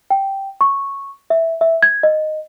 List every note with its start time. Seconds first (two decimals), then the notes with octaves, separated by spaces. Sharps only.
0.10 G5
0.61 C#6
1.30 E5
1.61 E5
1.83 G#6
2.03 D#5